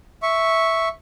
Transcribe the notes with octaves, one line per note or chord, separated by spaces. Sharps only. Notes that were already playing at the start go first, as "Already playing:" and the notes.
E5 C#6